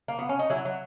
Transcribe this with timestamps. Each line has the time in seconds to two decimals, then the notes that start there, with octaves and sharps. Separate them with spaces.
0.08 A#3
0.19 B3
0.29 C#4
0.39 D#4
0.50 F#3 E4
0.65 F#3